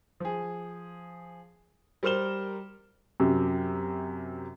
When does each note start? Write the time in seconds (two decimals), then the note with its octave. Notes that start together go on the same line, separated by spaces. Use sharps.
0.20 F3 G#4
2.03 G3 A#4 C5 F6 E7 G7
3.20 F#2 C3